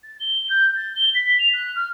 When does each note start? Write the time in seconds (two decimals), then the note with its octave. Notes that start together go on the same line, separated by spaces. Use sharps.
0.04 A6
0.20 G7
0.49 G6
0.76 A6
0.96 G7
1.14 B6
1.39 F7
1.54 F#6
1.76 F6